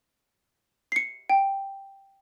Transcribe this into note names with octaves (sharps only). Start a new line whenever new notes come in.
C7 C#7
G5